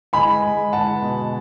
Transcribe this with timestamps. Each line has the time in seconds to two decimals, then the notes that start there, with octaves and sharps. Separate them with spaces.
0.13 G#3 G#5 B5
0.43 G#3
0.72 G#3 F#5 A5
1.02 B2